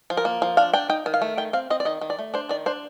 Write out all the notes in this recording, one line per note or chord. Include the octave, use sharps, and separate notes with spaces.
F3
A#4
A#3
F3
D4 F5
D4 G5
D#4 G5
D#3
F5
A3
D#3 G5
C4 F5
C4 D#5
D5
D#3 D#5
D#3
D5
A3
D4 C5
D#3 D5
D4 C5